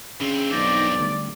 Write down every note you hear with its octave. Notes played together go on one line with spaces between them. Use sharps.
G2 C#3 C4
B1 D#4 D5 G6 A#6
D3 G3 A3